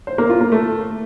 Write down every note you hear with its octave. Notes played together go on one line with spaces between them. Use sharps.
C5
A#3
F4
A#3
A3